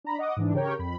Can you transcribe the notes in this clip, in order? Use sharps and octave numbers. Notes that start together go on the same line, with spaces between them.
D4 A#5 B5
D#5 F#5 D6 D#6
G#2 E3 D4
C#3 G4 A#4 C#5 G5
F2 B5